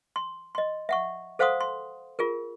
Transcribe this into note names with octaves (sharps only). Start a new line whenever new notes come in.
C6
D#5 C6
E5 F#5 C#6
A4 C5 F5 F#5 C6 D#6
C6
F4 G#4 A#4